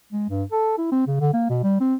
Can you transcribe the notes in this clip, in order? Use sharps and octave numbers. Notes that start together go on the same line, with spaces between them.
G#3
G2
A4
E4
C4
C#3
D3
A#3
B2
G3
C4